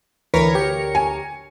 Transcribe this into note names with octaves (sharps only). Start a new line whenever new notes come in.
D2 E3 A#4 B4 C#5
G4 C#7
G#5